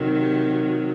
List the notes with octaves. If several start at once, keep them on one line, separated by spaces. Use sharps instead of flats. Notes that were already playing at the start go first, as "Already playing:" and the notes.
Already playing: C3 D#3 F#3
G4